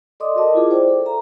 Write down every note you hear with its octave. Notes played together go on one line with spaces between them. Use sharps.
A4 D5 D#5 C6 D6 D#6
F#4 A#4 D#5 A5
E4 F4 G#4 D6
C5 D5 G5
A4
E5 A#5